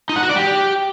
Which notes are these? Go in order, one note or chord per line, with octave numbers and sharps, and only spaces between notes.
D#4
F#5
F#4
D5
G4